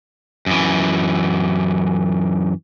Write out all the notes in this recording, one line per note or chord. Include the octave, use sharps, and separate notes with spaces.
F#2 E3